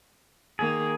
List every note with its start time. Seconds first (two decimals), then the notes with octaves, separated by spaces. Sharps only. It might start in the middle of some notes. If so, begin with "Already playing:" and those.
0.59 D#3 A#3 G#4